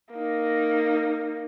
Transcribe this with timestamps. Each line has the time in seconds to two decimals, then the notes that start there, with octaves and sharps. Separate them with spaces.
0.15 A#3 D#4